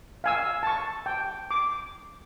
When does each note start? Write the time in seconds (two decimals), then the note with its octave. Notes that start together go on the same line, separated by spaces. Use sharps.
0.24 F5 G#5 E6
0.63 A5 C#6
1.06 G5
1.51 D6